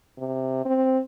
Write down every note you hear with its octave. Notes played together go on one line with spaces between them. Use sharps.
C3
C4